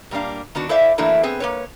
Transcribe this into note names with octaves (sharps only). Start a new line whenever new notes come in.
A#2 G3 A#3 D4 F5
D#3 B3 D4 F#4
E4 A4 C5 D5 E5 F5
E3 F#3 A3 A#3 D4 E4
B3 C4 G#4 B4
A#3 B4 C#5